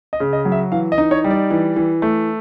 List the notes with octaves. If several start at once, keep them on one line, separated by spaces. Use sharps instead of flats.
D#5
C#3
D#5
F#3
E5
E3 F5
D#5
D#4
C#5
G3
D5
E3
E3
A3